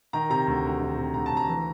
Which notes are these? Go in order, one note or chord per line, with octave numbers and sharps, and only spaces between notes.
D#3 A#5
C3 A#5
D2
D2
D#3
C3
D2 A#5
D2 A5
A#5
E3